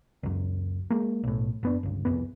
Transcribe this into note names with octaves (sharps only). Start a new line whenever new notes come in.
C#2 F#2
G#3 A#3
B1 A2
F#1 B3 D4
G1 C#2
C2 F2 B3